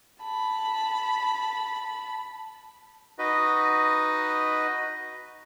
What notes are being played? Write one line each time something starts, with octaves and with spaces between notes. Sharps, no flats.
A5 B5
D#4 F#4 B4 D#5